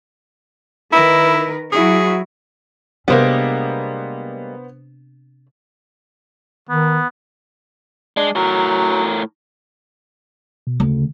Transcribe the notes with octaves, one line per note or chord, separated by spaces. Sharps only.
D#3 E4 A#4 B4
F#3 E4 F#4 G#4
C3 G3 G#3 A#3 B3 D4 C5
D#3 B3
G#3 D4
A2 F#3 A#4
B2
D2 C#3